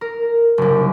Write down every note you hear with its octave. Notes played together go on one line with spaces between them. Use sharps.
A#4
F#1 C2